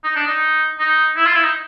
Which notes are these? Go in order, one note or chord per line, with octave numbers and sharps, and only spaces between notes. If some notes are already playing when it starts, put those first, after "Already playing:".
D#4
D4
D#4
D#4
E4
F4
E4
D#4